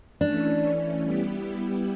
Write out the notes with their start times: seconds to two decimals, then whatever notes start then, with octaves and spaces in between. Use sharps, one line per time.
0.21 E3 A3 C#4 D4
1.03 G3 B3 E4 G4